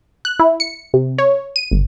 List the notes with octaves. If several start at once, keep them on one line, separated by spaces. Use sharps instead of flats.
F#6
E4
C#7
C3
C#5
D#7
G1